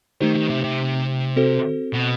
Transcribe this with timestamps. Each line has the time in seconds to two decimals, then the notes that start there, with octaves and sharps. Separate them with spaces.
0.21 D#3 A3 D#4 G4 C5
0.35 D#3
0.50 C3
0.64 C3
1.36 C4 F#4 A4 C5
1.94 B2